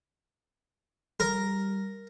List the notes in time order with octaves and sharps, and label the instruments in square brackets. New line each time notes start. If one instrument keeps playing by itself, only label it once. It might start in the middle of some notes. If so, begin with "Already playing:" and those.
[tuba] G3 [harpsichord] A#4